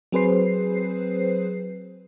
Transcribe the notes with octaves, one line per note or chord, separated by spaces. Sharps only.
F#3 C4 G#4 B4 C5 C7